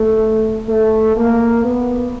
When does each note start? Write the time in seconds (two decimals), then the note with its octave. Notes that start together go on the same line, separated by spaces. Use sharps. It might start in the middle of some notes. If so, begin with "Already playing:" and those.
Already playing: A3
0.68 A3
1.17 A#3
1.65 B3